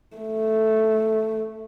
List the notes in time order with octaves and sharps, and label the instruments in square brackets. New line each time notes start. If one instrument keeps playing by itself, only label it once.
[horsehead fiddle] A3